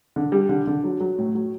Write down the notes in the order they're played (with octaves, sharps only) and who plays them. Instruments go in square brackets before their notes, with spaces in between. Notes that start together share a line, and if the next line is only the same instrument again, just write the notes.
[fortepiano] D3
G3
D3
D3
F#3
F#3
A2
F#3